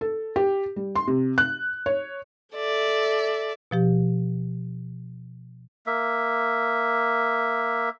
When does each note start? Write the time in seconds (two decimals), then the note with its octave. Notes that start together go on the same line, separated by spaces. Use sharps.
0.01 A4
0.36 G4
0.76 G3
0.96 C6
1.08 C3
1.38 F#6
1.86 C#5
2.54 A4 D5 E5
3.71 B2 F3 G4
5.87 A#3 E5